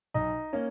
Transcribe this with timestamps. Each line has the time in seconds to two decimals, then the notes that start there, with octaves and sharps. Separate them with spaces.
0.14 B1 D#4 D#5
0.53 A#3 C#4